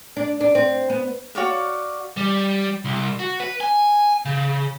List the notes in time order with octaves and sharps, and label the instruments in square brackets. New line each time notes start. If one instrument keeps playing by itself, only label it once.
[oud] D4
D4
C4
B3
[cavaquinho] F#4 C#5 D5 F5
[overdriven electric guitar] G3
C2
F#4
B4
G#5
C#3